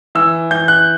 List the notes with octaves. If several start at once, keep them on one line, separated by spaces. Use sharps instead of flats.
E3 E6
E3 G6
F#6